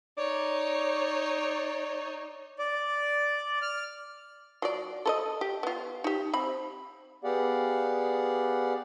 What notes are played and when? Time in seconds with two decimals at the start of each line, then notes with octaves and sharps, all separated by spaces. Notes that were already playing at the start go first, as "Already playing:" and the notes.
0.18 D#4 C#5 D5
2.59 D5
3.62 F6
4.62 F#3 F4 D5
5.06 A4 B4 D#5
5.41 G4
5.63 B3 F4
6.04 D#4 G4
6.33 C4 B5
7.24 B3 G4 G#4 D5 F5 F#5